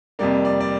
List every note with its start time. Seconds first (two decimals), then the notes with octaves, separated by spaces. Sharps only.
0.19 F2 C3 G3 A#3 D5
0.45 D5
0.60 D5